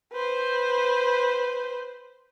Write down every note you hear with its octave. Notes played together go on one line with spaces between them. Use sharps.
B4 C5